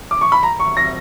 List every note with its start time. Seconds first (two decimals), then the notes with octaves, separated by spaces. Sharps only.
0.11 D6
0.21 C#6
0.32 B5
0.43 A#5
0.59 C#6
0.77 A#6